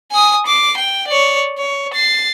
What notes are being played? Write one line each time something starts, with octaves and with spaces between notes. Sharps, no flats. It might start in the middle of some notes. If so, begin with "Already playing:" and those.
G#5 D#6
D6 C7
G5
C#5 D5
C#5
A6 C7